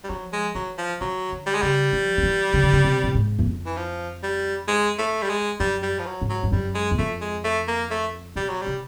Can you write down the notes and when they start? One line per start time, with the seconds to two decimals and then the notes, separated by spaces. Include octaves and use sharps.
0.04 G3
0.10 F3 F#3
0.32 G#3
0.55 E3 F#3
0.78 F3
1.01 D#3 F#3
1.32 D3
1.47 G3
1.55 G#3
1.62 C#3 G3
1.93 F3
2.18 F3
2.23 E3
2.54 C#3
2.63 D3
2.73 C#3
2.84 C3
3.04 A2
3.15 G#2
3.39 E2
3.46 F2
3.66 E3
3.77 F3
4.23 G3
4.68 G#3
4.98 A3
5.22 G3
5.30 G#3
5.60 F#2 G3
5.83 G3
5.99 F3
6.06 F#3
6.21 G#2
6.29 F#3
6.43 G2
6.52 F#2 G3
6.75 G#3
6.91 E2
6.98 F2 A3
7.21 G#3
7.44 A3
7.68 A#3
7.90 A3
8.36 B2 G3
8.49 F#3
8.62 C3 G3